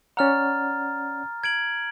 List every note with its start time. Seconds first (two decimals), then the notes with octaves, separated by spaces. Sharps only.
0.17 C#4 D5 F#5 A#5 F6 A6
1.44 G#6 D7 F#7